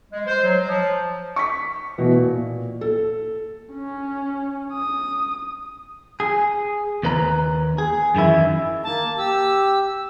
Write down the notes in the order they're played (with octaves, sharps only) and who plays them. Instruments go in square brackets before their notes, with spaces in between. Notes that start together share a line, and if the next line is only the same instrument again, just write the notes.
[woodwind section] G#3
C5
F#3
F3
[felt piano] C#6 B6
B2 E3
A#2
A4
[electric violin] C#4
D#6
[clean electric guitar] G#4
D#2 B4 A#5
G#4
F#2 D#3 E3 E4
[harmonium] A#3 [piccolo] A5
[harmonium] G4 [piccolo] E6